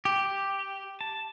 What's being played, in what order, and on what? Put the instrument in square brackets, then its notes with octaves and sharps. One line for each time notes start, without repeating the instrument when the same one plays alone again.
[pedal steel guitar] G4
A5